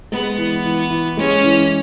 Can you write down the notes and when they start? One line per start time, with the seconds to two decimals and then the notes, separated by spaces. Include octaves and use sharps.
0.12 G#3 B3
0.38 E3
0.65 E3
0.90 E3
1.17 G#3 C#4
1.44 E3